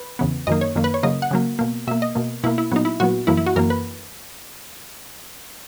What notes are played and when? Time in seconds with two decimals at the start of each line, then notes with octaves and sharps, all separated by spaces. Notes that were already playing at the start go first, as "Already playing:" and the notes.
Already playing: B4
0.19 E2 C#3 E3 B3
0.47 F#2 D#3 A#3 D#5
0.61 C#5
0.75 F#2 D#3 A#3
0.84 B4
0.94 C#5
1.03 C#3 F#3 A#3 D#5
1.22 F#5
1.31 C#3 F#3 A#3
1.59 B2 A#3
1.87 B2 A#3 E5
2.02 D#5
2.15 B2 A#3
2.44 B2 A#3 E4
2.58 E4
2.71 A#2 F#3 B3 D#4
2.85 E4
3.00 A#2 F#3 B3 F#4
3.27 F#2 E3 A#3 E4
3.37 E4
3.46 F#4
3.56 F#2 E3 A#3 A#4
3.70 B4